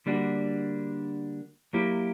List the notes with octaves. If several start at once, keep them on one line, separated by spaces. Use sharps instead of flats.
D3 G3 A#3 D4 F#4
F#3 A#3 E4 G4